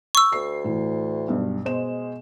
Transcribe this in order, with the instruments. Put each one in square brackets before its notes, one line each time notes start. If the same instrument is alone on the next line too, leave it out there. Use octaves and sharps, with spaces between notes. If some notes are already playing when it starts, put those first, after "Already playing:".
[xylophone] C#6 E6
[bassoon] D2 [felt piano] C7
[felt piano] A2 E3
B1 G2
[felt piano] B2 C5 E7 [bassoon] G#3